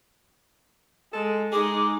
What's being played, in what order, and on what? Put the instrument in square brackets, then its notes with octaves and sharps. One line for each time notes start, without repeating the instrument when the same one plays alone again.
[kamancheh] G#3 [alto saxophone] A4
[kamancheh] G#3 D#4 [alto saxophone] G#4 [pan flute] D6